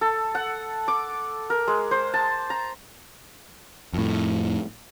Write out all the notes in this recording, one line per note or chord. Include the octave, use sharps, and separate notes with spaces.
A4
F#5
D6
A#4
G#3
C5
A5
A#5
F2 A2